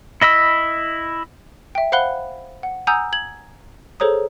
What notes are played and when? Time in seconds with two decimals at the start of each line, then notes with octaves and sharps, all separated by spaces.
0.22 E4 D#5 B5 E6
1.75 E5 G5
1.92 C5 F5 F#5 B5 F#6 G7
2.63 F#5
2.87 F#5 G#5 A#5 D#6 E6 G6
3.13 G#6 F#7
4.00 G#4 A4 C5 C#5 A#5 D#6